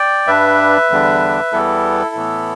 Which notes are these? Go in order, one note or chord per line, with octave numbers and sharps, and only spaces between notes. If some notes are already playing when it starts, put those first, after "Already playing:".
Already playing: D5 G5
G2 G3 D4 B4 E5
E2 D3 G3 D4
E2 E3 G3 B3 E4 A4
A2 E3 B3